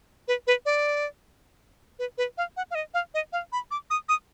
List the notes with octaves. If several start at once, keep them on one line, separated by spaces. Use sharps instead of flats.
B4
B4
D5
B4
B4
F5
F#5
F5
D#5
F5
D#5
F5
B5
D6
D#6
D#6